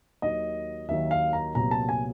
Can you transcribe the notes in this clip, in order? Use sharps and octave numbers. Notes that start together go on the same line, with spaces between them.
D#2 D#3 F#3 D#5
D#2 D#3 F#3 E5
F5
A#5
C2 A#2 F#3 B3 A#5
A5
G#5